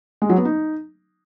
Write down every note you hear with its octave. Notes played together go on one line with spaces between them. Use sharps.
G#3
F#3
B3
D#4